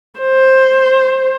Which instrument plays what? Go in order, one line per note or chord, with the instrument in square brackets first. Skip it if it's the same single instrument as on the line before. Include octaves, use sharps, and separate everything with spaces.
[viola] C5